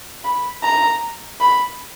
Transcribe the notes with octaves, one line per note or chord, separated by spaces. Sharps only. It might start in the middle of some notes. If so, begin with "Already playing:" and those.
B5
A#5
B5